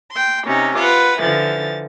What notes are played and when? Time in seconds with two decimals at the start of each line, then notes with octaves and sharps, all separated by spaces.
0.12 G5 C6
0.45 C3 C#4 D#4
0.78 F4 B4 F#5
1.20 D3 E3 F3 A6